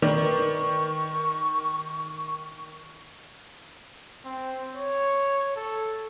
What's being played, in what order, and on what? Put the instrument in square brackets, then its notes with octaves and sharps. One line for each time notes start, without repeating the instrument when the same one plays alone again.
[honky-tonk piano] D#3 [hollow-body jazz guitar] A#4 B4 D5 [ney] C#6
[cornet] C4
C#5
A4